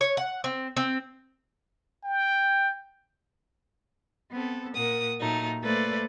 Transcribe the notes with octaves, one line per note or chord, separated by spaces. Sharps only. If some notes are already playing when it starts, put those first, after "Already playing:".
C#5
F#5
C4
C4
G5
B3 C4 A4
A#2 A#4 F#5 D#6
A#2 F#3 A3 D#4
A3 A#3 A4 B4 C5 D5